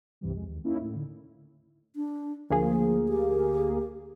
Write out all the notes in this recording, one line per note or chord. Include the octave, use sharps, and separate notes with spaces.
C2 G2 C3 E3 G3
F2 G#3
D#2
A#3 C#4 D#4 E4
A2
D3
D4
D2 F3 A#3 G#4
G4